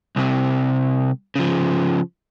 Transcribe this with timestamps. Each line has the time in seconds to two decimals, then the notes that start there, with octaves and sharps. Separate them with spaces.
0.16 C2 C3
1.36 C#3 F3